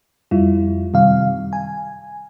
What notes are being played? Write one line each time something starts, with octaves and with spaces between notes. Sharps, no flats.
F2 G3 E4 F4
F#2 C3 D#3 G3 F5
G#5